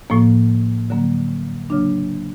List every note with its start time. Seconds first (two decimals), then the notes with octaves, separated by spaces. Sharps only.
0.10 A2 F3 A#3
0.90 D3 F#3 A#3
1.70 C#3 F#3 A#3 D4